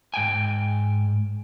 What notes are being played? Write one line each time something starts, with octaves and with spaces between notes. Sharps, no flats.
G#2 G5 G#5